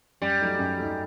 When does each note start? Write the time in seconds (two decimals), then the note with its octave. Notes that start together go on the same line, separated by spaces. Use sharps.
0.21 F#2 G3
0.40 F#3 A3 D#4
0.59 F#2
0.78 F#3 A3 D#4